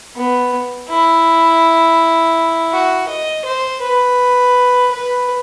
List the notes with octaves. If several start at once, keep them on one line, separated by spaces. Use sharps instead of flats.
B3
E4
F#4
D#5
C5
B4
B4